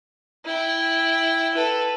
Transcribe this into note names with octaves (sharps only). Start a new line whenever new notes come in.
E4 G5
A4 B4